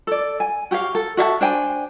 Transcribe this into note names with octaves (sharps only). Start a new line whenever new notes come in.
A4 D5
G#5
F#4 G4 C#5 F5
A4
F#4 E5 F5 A5
D4 C5 G5 G#5